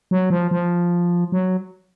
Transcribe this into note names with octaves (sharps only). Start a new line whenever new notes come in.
F#3
F3
F3
F#3